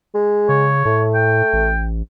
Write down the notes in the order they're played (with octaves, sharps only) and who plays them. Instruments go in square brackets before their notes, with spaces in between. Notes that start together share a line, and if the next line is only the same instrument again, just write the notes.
[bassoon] G#3
[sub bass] C#3 [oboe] C#5
[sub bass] A2 [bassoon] A3
[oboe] G5
[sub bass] A1